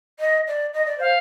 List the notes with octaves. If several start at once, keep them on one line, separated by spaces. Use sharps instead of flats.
D#5
D5
D#5
D5
C5 F5